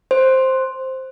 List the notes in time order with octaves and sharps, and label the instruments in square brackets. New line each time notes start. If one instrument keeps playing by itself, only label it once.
[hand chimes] C5